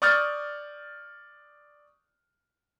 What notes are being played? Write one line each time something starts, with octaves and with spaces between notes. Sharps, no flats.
D5 C#6 D#6 F6 G6 A6